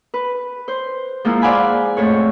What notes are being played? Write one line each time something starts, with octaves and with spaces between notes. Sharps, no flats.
B4
C5
F3 G#3 A#3 E4 F4
C5 D5 F5 F#5 G#5 B5
F2 A2 C#5